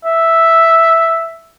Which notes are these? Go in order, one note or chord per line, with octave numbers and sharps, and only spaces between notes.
E5